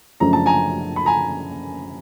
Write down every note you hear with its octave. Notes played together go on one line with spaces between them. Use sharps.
F#2 C#3 F3 A3 D4 A#5
A5
G#5 A#5
B5
G#5 A#5